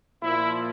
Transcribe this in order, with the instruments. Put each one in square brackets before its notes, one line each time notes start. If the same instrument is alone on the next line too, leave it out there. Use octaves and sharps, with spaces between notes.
[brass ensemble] A#2 F3 E4